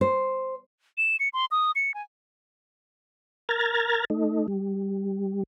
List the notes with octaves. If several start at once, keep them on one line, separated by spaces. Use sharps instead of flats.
C5
E7
C#7
C6
D#6
C#7
G#5
A#4 A#5 F6 G#6 A6
A3 D#4
G3